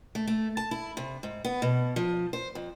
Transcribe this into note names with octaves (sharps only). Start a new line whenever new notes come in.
A3
A3
A5
E4
C3
G#2
B3
B2
F3
C5
F2